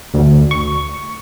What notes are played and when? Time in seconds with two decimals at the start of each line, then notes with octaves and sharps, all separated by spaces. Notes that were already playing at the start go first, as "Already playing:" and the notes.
0.14 D2
0.51 C#6